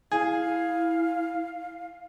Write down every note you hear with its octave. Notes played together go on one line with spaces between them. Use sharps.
E4 G#4 F5